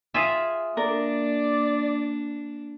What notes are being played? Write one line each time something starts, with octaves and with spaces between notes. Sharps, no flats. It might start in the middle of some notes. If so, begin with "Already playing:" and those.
F4 G#4 E5
A#3 D4 A#4 D5